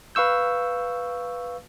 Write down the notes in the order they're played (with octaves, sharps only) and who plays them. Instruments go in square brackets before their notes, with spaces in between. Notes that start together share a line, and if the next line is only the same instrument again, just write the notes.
[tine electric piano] B4 F5 C#6 E6 G6